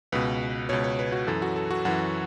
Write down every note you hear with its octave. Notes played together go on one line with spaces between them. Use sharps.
C#2 B2 B4
C#2 B2 C#5
C#5
B4
F#4
F#2 E3 A4
F#4
A4
F#4
F#2 E3 F#5